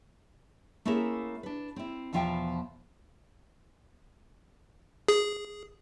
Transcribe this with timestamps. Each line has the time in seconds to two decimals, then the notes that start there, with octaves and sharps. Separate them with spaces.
0.85 A3 A#3 C#4 E4 G#4 A#4
1.43 D4 B4
1.76 C4 E4
2.13 E2 B2 F3 F4 E5 G5
5.08 G#4